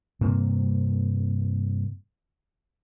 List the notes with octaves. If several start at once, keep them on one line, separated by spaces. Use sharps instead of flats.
G2 C3 A#3 C4